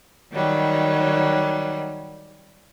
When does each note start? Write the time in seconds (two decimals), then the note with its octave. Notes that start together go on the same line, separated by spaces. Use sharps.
0.32 D#3 F#3 G3